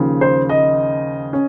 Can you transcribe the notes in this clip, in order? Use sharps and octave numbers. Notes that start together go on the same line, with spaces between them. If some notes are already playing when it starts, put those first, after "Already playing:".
Already playing: D#2 C#3 F3
C5
D#5
C#4